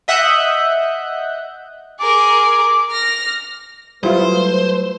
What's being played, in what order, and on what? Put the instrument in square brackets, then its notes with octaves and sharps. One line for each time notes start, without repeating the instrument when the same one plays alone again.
[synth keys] D#5 E5 F#5 D#6 F#6 G6
[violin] G#4 A#4 [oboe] D6
[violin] F6 A#6
[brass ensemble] F#3 A3 B4 [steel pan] G3 E4 F4 [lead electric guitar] C5